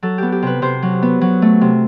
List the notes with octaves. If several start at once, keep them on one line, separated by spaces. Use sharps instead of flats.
F#3 A4
B3 G4
G4
C3 B4
C3 C5
F#3
B3
F#3
A3
C3